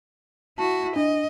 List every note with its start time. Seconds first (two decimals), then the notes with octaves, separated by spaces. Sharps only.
0.58 E4 F#4 A5
0.96 D4 D#5